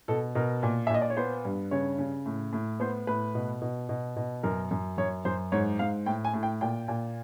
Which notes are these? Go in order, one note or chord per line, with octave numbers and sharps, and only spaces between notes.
B2 A4
B2 A#4
A#2
E5
A#2 D#5
D5
C#5
B3 C5
G2
C#3 C#5
C#3
A2
A2
B3 C5
A2 B4
B2
B2
B2
B2
F#2 A#4
F#2
F#2 C#5
F#2 C5
G#2 C#5
G#2 F5
A2 G5
G#5
A2
G5
A#2 G5
A#2